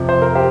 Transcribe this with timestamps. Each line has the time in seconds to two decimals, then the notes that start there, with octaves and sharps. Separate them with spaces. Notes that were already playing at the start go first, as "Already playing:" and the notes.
Already playing: F2 C3 F3
0.09 C5
0.22 A#4
0.35 G4 C5